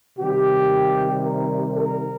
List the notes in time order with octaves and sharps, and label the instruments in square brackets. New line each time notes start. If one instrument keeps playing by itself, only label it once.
[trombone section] C3 D#3 G3 G4
A#4
A#4